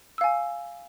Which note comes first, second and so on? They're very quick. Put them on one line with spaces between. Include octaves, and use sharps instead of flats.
E6 F5 G#5